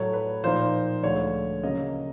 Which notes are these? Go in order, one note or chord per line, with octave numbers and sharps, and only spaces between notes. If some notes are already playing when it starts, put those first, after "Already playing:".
Already playing: A2 F#3 A3 C#5
B4
A#2 F3 A#3 D#4 C5
D2 D3 F3 G#3 C#5
C#3 F#3 A#3 C#4 D#5